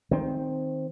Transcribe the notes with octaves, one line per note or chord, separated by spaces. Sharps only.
D#3 C4